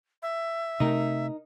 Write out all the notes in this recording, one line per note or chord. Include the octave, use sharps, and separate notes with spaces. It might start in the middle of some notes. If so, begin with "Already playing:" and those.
E5
C3 A3 D#4 A#4